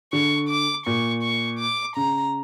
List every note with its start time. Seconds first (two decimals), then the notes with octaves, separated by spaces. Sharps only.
0.13 D3 C#6
0.49 D6
0.86 A#2 C#6
1.23 C#6
1.59 D6
1.96 C#3 A#5